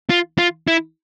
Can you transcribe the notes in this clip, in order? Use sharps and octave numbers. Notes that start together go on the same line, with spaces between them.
F4
F4
E4